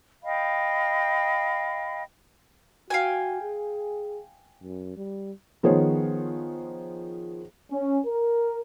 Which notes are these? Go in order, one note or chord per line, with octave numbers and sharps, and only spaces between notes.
D#5 F5 G5 B5
F#4 F5 G5 G#5
G#4
F#2
G3
D#3 F3 B3 G#4 C5 C#5
C#4
A#4